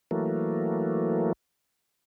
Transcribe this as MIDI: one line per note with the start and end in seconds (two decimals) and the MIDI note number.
0.11 1.33 52
0.11 1.33 54
0.11 1.33 57
0.11 1.33 58